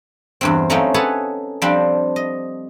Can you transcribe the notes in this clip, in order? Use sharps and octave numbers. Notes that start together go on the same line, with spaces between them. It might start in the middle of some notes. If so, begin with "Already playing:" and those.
E2 G2 C4
F#3 A3 C4 C#4 D#4 F4
G#4 A4 B4 C#5 F#5 A5
F3 G3 C4 D4
D#5